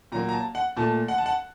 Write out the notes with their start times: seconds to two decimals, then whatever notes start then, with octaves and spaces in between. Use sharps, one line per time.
0.12 A#2 F#3 A#3 A#5
0.29 A#5
0.33 A5
0.55 F#5
0.77 A#2 A3 A5
1.08 F#5
1.18 A5
1.26 F#5